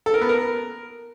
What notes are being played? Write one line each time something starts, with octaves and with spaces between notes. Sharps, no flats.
A4
A#4
B3
A#4